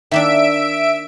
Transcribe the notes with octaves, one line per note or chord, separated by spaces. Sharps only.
D#3 A#3 D4 E5 D7